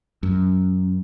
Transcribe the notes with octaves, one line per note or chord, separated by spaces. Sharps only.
F#2